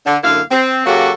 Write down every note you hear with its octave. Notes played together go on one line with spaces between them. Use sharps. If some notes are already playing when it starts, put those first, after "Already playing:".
D3
F#2 D3 A#3 E4 F5
C4
C#3 F#3 A#3 F#4 G4 A4